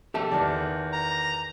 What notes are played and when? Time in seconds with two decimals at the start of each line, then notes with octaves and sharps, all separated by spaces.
0.14 G4 A4 E5 A5
0.31 E2 D#3 D5
0.93 A#5